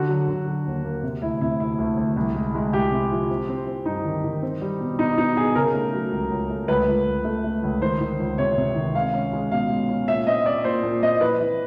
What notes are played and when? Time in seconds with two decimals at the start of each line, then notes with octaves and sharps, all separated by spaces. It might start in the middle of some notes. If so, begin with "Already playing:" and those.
Already playing: D3 F#4
0.08 F#3
0.28 D3
0.46 F#3
0.66 D#2
0.84 A#3
1.03 C3
1.22 D2 E4
1.41 C3 E4
1.60 D2 E4
1.79 D2
1.97 D2
2.16 C2
2.35 G#3
2.55 G#3
2.73 C2 G4
2.91 C3
3.11 F3
3.30 C4
3.49 C4
3.67 C4
3.85 G2 D#4
4.05 D#3
4.24 D#3
4.43 C4
4.61 G3
4.81 B2
4.99 B2 D#4
5.18 B2 D#4
5.37 B2 G#4
5.55 C#3 A#4
5.74 A3
5.94 F#3
6.12 C#2
6.31 C#2
6.50 A3
6.68 C#2 B4
6.88 C#2
7.07 C#2
7.25 A3
7.44 A3
7.63 C#2
7.82 D#3 C5
8.01 D#3
8.20 C#2
8.38 C3 C#5
8.57 C3
8.75 D#3
8.94 G#3 F5
9.14 C#4
9.33 G#3
9.52 B2 F5
9.70 G#3
9.89 C#4
10.07 A#2 E5
10.27 C4 D#5
10.45 C4 D5
10.64 A#2 C5
10.83 A#2
11.03 C4 D#5
11.21 E3 B4
11.40 E3